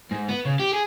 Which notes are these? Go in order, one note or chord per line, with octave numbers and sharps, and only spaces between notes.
G#2
B3
C#3
G4
G#4